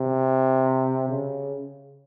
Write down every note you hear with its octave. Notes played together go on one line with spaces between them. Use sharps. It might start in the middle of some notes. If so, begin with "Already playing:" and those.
Already playing: C3
C#3